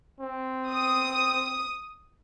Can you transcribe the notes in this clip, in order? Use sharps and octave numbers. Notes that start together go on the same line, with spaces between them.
C4
D#6